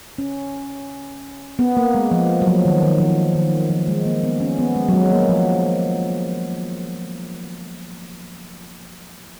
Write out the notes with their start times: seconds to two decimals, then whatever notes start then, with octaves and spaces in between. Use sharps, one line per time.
0.18 C#4
1.59 B3
1.77 A#3
1.95 G#3
2.11 F3
2.42 F#3
2.48 F3
2.65 D#3
2.82 D#3
3.00 F3
3.35 D#3
3.70 F3
3.88 G#3
4.05 A#3
4.23 B3
4.40 C#4
4.58 B3
4.76 G#3
4.88 F#3
4.93 G#3
5.11 A#3
5.29 F3